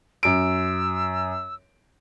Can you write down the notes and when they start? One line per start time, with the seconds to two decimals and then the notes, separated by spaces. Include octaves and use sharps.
0.23 F#2 E6 D7